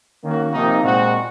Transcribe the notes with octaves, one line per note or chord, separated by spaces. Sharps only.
D#3 A#3 C#4 F#4
C3 F3 A#3 D#4
A#2 G#3 C4 F#4